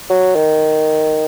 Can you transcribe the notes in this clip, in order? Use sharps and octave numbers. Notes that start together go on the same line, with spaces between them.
F#3
D#3